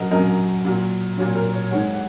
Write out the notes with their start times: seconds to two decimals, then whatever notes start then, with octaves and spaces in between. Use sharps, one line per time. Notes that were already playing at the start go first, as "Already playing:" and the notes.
Already playing: F#2 F#3 A#4 D#5 F#5
0.11 F#2 F#3 A#4 D#5
0.65 A#2 F#3
1.18 A#2 F#3 C#5
1.35 A#4
1.54 C#5
1.71 G#2 D#3 G#3 C#5 F#5
1.93 F#5